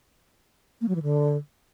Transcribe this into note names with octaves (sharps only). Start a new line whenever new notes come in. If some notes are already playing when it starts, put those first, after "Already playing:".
A#3
F#3
E3
D3